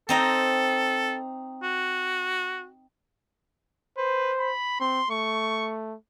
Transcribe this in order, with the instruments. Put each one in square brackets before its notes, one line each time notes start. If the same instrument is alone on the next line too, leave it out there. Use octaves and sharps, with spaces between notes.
[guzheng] C4 D#4 A#5 [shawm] A4
[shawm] F#4
[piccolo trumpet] B4 [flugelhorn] C5
[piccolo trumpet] B5
[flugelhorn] C4 [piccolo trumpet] C6
[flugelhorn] A3 [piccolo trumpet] C#6